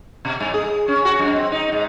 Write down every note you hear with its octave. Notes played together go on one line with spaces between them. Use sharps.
B2
G2
G#4
C#4
F#4
F#2
C4
D#4
G#2